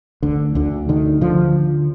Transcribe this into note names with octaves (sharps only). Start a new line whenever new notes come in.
D2 D3
D2 D3
D3 D#3
D3 F3